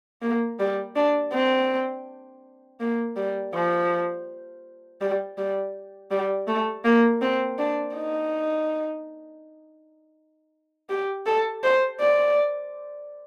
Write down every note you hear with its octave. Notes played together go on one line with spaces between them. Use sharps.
A#3
G3
D4
C4
A#3
G3
F3
G3
G3
G3
A3
A#3
C4
D4
D#4
G4
A4
C5
D5